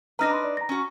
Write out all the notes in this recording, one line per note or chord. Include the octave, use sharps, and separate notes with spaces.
D4 D#4 B4 A#5 F6 A#6
B5 C6
D5
A#5 A#6
C#4 F#4